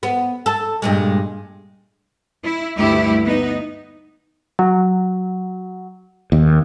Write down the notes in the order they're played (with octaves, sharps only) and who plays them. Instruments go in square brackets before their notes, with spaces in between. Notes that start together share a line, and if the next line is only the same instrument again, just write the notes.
[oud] B3
A4
G2 A#2 G#3
[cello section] E4
D2 G2 E4 G4
B3 D#4
[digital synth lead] F#3
[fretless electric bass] D#2